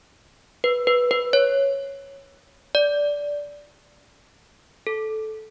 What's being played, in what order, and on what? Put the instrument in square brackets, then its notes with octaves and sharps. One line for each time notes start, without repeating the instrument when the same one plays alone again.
[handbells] B4
B4
B4
C#5
D5
A4